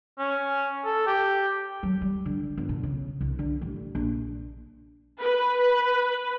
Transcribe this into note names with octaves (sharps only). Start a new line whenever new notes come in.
C#4
A4
G4
F#3
G3
D3
G1
B2
C#3
C2
D3
A1
A#1
B4